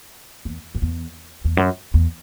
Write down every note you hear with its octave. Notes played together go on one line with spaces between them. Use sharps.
E2
F#2
E2
E2
F#2
E2